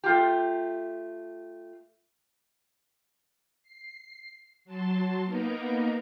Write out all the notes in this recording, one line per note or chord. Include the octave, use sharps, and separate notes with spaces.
A3 F4 G4
C7
F#3 A5 C6
A#3 B3 D#4 A#4 A#5